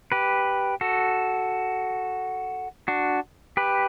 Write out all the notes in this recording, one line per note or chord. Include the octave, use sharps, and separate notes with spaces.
G4 B4
F#4 A4
D4 F#4
G4 B4